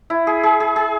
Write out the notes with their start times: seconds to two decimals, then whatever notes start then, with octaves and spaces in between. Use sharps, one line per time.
0.10 E4
0.27 G#4
0.43 G#4
0.60 G#4
0.76 G#4